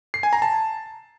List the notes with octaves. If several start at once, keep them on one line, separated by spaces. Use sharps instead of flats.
C7
G#5
A#5
A5